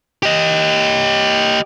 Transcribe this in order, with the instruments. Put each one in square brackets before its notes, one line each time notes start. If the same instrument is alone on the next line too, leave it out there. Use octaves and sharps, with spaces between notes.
[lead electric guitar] G4 D#5